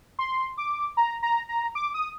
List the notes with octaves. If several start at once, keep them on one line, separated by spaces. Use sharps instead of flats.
C6
D6
A#5
A#5
A#5
D6
D#6